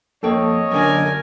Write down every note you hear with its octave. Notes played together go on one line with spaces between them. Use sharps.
F2 A#3 A4 C#5 D#5 G5
F#2 D3 A#4 D5 G#5